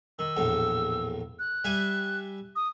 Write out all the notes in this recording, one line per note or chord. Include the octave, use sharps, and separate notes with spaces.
D#3 E6
A#1 E2 A2
F#6
G3 E5 G#5
D#6